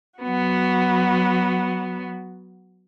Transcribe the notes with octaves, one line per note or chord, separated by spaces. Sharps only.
F#3 B3 F#4